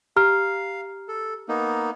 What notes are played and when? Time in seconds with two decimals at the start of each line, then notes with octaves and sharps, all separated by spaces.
0.16 G4 F5 A#5 F6
1.08 A4
1.49 A#3 B3 D#4